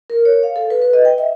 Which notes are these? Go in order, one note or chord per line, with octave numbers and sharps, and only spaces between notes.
A#4
C#5
F5
A4
B4
B4
D#5
G5
E5